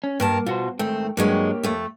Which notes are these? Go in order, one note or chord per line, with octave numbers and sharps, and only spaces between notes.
C#4
G2 A#3 A#4 A5
B2 F4 F#4 C5
G#2 D#3 A3 C4
G2 F#3 G#3 A#3 G4 C#5
F2 A3